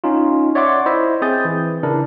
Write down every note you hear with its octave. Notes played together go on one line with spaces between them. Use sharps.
C#4 D#4 F4
C#5 D5 E5 F#5 C6 D6
E4 C5 D#5 E5
C4 G#4 D#6 G6 A6
E3
C#3 D4 E4 A#4